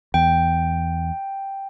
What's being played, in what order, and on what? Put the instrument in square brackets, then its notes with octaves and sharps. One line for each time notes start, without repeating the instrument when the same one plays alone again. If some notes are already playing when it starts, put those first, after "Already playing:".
[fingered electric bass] E2 [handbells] G5